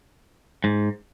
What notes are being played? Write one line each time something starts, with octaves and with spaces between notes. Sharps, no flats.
G#2